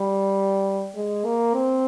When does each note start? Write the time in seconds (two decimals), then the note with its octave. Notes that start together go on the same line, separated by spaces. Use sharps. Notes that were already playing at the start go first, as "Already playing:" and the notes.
Already playing: G3
0.95 G#3
1.25 A#3
1.54 C4